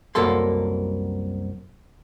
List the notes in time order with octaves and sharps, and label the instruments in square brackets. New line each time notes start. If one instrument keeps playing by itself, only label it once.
[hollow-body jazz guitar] C2 F#2 A#3 A4 C6